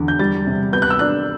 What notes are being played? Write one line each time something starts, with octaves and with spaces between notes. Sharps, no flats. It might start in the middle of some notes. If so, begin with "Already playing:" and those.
Already playing: E2 D3
G6
G3 A6
C3
B3 G6
F#6
E6
D4 F#6